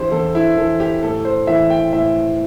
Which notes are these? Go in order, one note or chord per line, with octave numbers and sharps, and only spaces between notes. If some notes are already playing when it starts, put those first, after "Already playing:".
Already playing: E2 E3 D4 E4 G4 C5
E2 A4
E4
E3 A4
G4
A2 A4
C5
E3 E5
G5
A2 E5